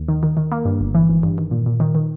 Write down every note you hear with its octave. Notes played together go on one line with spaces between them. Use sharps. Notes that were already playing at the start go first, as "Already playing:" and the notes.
Already playing: D#2
D#3
D#3
D#3
A#3
G2
G1
E3
G#1
G2
D#3
A#2
A#2
D#3
D#3